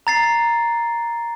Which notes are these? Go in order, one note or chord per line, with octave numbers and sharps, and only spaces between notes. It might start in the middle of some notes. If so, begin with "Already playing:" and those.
A#5 A6 C7